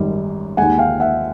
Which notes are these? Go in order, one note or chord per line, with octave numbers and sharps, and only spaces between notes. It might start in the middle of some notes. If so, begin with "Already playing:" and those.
Already playing: G#1 F#2 D#3 G3
D#2 D#3 G#3 F#5 G#5
F5 G5
E5 F#5